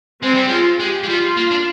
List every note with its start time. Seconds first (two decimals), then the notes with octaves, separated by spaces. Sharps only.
0.23 G#3 C4
0.34 G3
0.48 G#3 F4
0.80 G#3 G4
1.03 G#3
1.09 G3 F4
1.37 A#3
1.51 D4